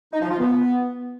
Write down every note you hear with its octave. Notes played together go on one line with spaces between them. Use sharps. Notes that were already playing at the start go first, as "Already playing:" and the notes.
D#4
F3
F4
B3